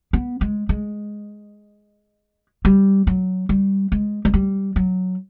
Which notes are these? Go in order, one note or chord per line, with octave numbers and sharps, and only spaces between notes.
B3
G#3
G#3
G3
F#3
G3
G#3
G#3
G3
F#3